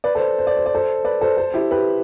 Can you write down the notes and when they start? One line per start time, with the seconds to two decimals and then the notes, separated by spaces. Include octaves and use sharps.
0.04 B4 D5
0.15 A4 C5
0.38 C5
0.47 D5
0.57 C5
0.66 D5
0.74 A4 C5
1.05 B4 D5
1.21 A4 C5
1.37 A4 C5
1.54 E4 G4
1.71 G4 B4